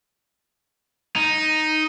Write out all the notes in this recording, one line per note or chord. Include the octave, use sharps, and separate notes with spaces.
D#4